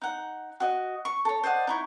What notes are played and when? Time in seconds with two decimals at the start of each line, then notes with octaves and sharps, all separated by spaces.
0.02 D#4 F#5
0.60 F#4 D#5
1.05 C#6
1.25 A4 C#5
1.43 C5 D5 D#5 F#5
1.67 D#4 E4 C#6